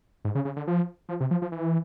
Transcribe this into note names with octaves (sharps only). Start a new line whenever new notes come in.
G#2
C#3
C#3
D3
F3
F3
C3
F3
F3
E3